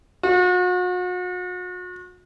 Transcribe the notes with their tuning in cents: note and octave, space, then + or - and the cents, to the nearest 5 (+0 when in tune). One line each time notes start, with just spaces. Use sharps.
F#4 -40